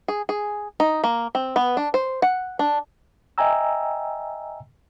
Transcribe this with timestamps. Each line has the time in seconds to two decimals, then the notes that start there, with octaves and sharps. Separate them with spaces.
0.08 G#4
0.29 G#4
0.80 D#4
1.04 A#3
1.35 C4
1.56 B3
1.77 D4
1.94 C5
2.22 F#5
2.59 D4
3.38 D#5 E5 G5 G#5 A#5 E6